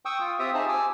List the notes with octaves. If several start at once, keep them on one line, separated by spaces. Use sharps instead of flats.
G5 C#6 D#6 E6
F4
C4 F4 G4 E5 D#6
D#4 G#4 C5 A5
G#5 D6 E6